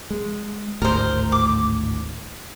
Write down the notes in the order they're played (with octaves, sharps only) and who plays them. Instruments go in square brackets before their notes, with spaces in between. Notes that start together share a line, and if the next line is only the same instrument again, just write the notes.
[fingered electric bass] G#3
[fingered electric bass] G#1 D2 A2 [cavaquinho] A#4 C5
[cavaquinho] D6